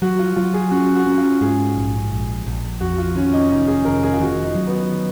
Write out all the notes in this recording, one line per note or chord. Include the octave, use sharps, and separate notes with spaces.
F#3 F#4
F4
F#3 F4
G#4
C#4 F#4
F#4
C#4
F4
G#2 G#4
A#1
A#1
A#1
F2 F#4
F4
D#3 C#4
D#4
F1 D#4
G#4
F1 A#4
G#4
F4
D#3 F#4
D#4
F#3
B3